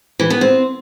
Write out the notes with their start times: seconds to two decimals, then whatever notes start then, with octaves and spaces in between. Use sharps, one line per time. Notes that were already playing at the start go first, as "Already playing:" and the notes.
0.20 E3
0.30 B3
0.41 C4